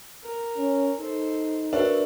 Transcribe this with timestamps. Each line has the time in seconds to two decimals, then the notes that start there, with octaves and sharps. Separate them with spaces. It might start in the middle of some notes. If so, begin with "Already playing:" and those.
0.23 A#4
0.57 C#4
1.00 D#4 A4 C5
1.73 D4 F#4 A#4 B4 E5